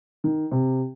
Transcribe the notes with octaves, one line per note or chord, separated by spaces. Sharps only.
D#3
C3